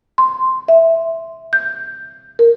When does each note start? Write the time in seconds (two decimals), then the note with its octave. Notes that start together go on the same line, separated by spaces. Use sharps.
0.18 C6
0.68 E5
1.53 G6
2.39 A#4